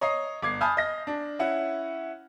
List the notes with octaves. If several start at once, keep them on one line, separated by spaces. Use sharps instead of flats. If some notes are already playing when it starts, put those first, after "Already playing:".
C#5 D#5 A#5 D#6 C7
G1 D6 G#6 C7
G#5 A5 B5 D#6 F6 G6
D#5 A#6
D4
C#4 E4 F#5